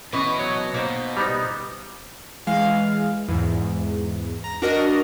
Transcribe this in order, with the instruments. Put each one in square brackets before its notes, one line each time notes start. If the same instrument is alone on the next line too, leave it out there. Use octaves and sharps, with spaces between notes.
[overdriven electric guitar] B2 D#5 [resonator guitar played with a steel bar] E3 C#4 B4
[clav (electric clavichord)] F#3 C#5
[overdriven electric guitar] B2 [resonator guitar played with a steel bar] A#3 D#4 C5
[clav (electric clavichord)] G3 B3 D#4 [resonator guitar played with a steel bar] C5 A#5
[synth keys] E3 G#3 F5
E2 G#2
A#5
D4 F#4 A#4 D#5